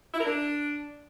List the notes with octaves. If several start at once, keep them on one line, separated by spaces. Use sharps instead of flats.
E4
A#4
D4